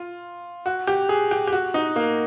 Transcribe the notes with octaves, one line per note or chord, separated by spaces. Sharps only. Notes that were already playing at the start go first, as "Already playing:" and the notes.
Already playing: F4
F#4
G4
G#4
G4
G4
F#4
D#4
A#3